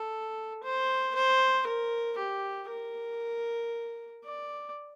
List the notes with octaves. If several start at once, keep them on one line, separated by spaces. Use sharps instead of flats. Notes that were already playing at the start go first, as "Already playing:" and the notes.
Already playing: A4
C5
C5
A#4
G4
A#4
D5